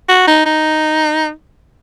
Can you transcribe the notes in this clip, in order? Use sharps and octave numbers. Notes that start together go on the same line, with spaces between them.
F#4
D#4
D#4